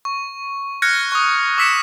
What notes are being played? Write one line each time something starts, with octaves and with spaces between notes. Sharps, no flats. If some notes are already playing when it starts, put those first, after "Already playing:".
C#6
F6 F#6 G#6 A#6 C#7
C#6 D#6
D6 E6 B6 C#7 E7